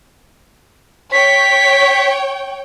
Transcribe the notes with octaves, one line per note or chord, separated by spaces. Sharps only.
C#5 G5 B6